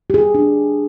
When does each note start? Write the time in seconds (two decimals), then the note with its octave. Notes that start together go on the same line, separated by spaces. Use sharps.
0.10 G4
0.14 G#4
0.34 D4